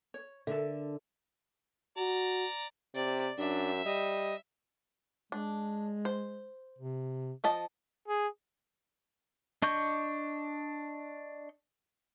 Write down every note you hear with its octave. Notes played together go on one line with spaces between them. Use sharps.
C#5
D3 A4 A#4 E5
F#4 D5 A#5
C3 D5
F#2 D4 E5
G3 D#5
G#3 D4
C5
C3
F3 D#5 A5
G#4
D4 D#5 C#6 G6